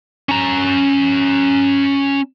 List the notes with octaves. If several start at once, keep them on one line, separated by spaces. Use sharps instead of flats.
C#4 A#5